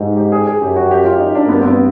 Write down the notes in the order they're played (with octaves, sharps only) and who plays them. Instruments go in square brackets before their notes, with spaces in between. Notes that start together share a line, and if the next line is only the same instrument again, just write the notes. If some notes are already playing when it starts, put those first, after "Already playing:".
Already playing: [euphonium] G#2 [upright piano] G4
[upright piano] G4
G#4
G#4
[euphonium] F#2 [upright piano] G4
[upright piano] F#4
G4
F4
D#4
D4
A#3
[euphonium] G2 [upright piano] B3
[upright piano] C4
B3